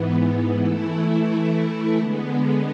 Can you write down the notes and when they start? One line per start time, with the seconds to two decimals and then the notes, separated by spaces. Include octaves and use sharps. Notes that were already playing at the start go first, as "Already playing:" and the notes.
Already playing: G#2 E3 B3
0.59 E3 A3 E4
1.97 D3 G#3 B3